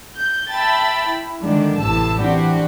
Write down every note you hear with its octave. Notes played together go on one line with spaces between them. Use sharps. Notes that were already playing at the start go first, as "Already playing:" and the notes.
G6
E5 G5 A5 B5 A6
E4
D3 D#3 G#3 D4
A1 A2 C3 A5 E6
E3 C4 D4 F#4 G4